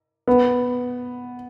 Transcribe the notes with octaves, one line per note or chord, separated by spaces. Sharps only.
B3